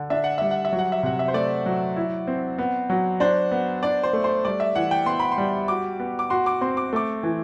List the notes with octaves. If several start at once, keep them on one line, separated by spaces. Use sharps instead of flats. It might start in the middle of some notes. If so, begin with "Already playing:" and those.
Already playing: D3
D4 E5
F#5
G3 E5
F#5
E5
F#3
F#5
E5
C3 F#5
E5
C5
A3 D5
F#3
E4
C4
B3
F#3
D4 C5
B3
D4 D5
C5
A3
C5
G3 D5
E5
E3 F#5
G5
B3 C6
B5
C6
G3
F#4 D6
B3
D6
F#4 C6
D6
C4 C6
D6
A3 D6
E3